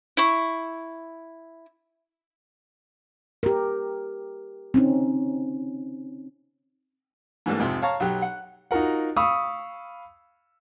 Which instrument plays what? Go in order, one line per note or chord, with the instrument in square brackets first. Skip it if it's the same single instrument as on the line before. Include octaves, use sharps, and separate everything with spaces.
[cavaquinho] E4 C#6
[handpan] G4 A#4
C4 C#4 D#4
[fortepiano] G#2 E3 G3 A3 A#3 D4
F2 G#2 C3 F3
C#5 F5 A5 A#5 C#6
B1 F#3 G4
F#5
[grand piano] D#4 F4 F#4 A#4 F#5
F5 B5 C#6 D#6 E6